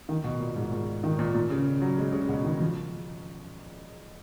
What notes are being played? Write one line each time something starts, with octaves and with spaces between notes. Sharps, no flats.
D#3
B2
A#2
G#2
A#2
D#3
A#2
A#2
C#3
F#3
G#3
C#3
B2
D#3
F3